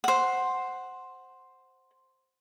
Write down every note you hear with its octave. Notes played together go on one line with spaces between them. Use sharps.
C5 F#5